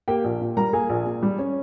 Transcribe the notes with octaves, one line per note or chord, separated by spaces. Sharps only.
A#3 G4 G5
A#1
A#2
G3 A#4 A#5
A#3 G#4 G#5
A#1
A#2
G3
C#4